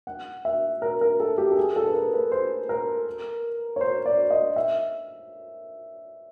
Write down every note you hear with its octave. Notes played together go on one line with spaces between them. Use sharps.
F#5
E5
A#4
A#4
A4
G4
A4
G#4
A4
B4
A#4
B4
C5
A#4
C#5
C5
D5
D#5
E5